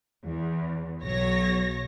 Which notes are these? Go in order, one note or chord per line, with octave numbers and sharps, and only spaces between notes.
E2
B1 F#3 C#5 A#6